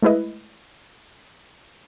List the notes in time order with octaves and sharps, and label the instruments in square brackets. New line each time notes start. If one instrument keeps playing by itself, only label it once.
[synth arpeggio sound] G#3 A3 E4 B4 D#5